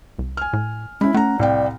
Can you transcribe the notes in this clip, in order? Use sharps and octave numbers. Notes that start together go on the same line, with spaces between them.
C2
G#5 F6
A2
G#3 C#4 E4 B5
A3 C#4 F#5 A#5
C2 A2 D5 F5 G5